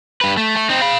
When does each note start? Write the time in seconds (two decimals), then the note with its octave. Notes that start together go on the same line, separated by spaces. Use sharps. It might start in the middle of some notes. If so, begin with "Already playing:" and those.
0.21 G2 B4
0.37 A3
0.57 A3
0.69 C4 D#4
0.81 F5 B5